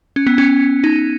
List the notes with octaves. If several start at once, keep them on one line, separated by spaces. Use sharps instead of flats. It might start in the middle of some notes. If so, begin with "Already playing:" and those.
C#4
B3
C#4
D#4